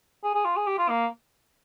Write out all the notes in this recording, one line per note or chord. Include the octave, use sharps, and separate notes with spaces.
G#4
G#4
F4
G#4
G4
F4
A#3